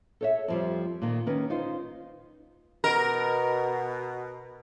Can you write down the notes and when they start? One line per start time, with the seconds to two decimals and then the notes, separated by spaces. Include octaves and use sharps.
0.21 A4 C#5 E5
0.48 F2 F3 G3
1.02 A#2 D#3
1.27 D#3 C#4 B4
1.50 D#4 F4 C5
2.84 B2 A#4